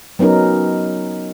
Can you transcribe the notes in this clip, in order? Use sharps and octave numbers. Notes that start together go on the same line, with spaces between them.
F#3 B3 C#4 D#4 A#4